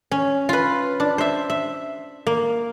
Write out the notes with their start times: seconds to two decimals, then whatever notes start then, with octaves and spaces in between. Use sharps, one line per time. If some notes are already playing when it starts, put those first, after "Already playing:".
0.11 C#4
0.49 F4 B4
1.00 D4
1.18 C5 E5
1.50 E5
2.27 A#3